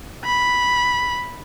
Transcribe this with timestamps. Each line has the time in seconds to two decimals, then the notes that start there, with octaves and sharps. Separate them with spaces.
0.25 B5